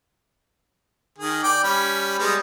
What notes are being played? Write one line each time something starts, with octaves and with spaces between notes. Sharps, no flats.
D#3 G#4
D5 G5 D6
G3 C#4 B5
G3 G#3 B3